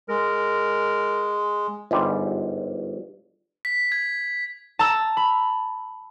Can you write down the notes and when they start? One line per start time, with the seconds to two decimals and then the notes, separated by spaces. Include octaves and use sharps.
0.09 G#3 A#4
1.91 G1 G#2 G3
3.65 B6
3.92 G#6
4.79 A5 A#5 E6
5.17 B5